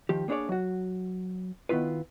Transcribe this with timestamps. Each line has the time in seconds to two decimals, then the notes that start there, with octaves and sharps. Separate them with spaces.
0.09 D#3 F3 G4
0.28 A#3 B3 D4 G#4 C#5 D5
0.49 F#3 F#4
1.69 D#3 B3 E4 F4 B4